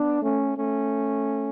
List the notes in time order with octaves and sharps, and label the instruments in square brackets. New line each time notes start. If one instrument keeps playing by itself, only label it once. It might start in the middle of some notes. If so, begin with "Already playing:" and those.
Already playing: [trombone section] B3 D4
A3 C#4
A3 C#4